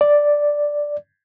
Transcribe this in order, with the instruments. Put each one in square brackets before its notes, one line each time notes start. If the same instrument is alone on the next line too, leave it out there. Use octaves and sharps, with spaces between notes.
[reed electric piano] D5